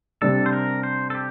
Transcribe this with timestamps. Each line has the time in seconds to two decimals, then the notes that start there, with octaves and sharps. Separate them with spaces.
0.22 C3 G3 D4 A4
0.46 C5
0.53 A#4
0.83 C5
1.10 A4
1.15 G4